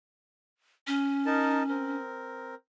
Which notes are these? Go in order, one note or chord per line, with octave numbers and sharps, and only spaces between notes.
C#4
D#4 A#4 A5
C4 A#4